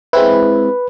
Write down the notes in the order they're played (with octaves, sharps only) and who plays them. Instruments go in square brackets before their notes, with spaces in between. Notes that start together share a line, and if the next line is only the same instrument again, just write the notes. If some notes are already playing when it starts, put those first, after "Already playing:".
[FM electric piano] G#3 C4 E4 [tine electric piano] B4